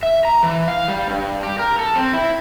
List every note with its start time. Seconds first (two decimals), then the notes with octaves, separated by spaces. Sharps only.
0.03 E5
0.25 A#5
0.43 E3
0.68 F5
0.88 G3
1.08 G2
1.43 G4
1.59 A#4
1.79 A4
1.96 C4
2.14 E4